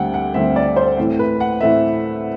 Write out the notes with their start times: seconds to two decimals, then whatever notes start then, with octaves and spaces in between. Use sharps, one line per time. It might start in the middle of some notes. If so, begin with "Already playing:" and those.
Already playing: D2 D3 G3 C4 F#5 G5
0.14 F#5
0.34 D2 D3 G3 C4 E5
0.56 D5
0.76 C5
0.98 A2 E3 A3 C4
1.19 B4
1.40 F#5
1.61 A2 E3 A3 C4 E5